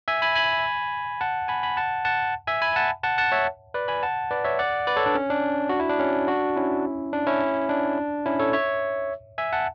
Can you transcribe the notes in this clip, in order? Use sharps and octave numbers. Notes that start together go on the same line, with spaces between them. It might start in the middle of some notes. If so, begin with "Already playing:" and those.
E5 G#5
G#5 B5
G#5 B5
F#5 A5
G#5 B5
G#5 B5
F#5 A5
F#5 A5
E5 G#5
G#5 B5
F#5 A5
F#5 A5
F#5 A5
C#5 E5
B4 D5
G#5 B5
F#5 A5
B4 D5
C#5 E5
D5 F#5
B4 D5
A4 C#5
D4
C#4
D4
F#4
E4
D4
C#4
D4 F#4
C#4 E4
D4
C#4 E4
D4
C#4 E4
A4 C#5
C#5 E5
E5 G#5
F#5 A5